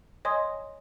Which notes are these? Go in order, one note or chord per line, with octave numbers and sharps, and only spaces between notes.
C#5 D#5 G#5 C6 D#6